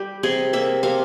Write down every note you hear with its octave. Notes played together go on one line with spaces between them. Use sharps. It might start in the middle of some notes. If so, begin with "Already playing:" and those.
Already playing: G3 G4
C3 G#4
A#3 E5
C3 F5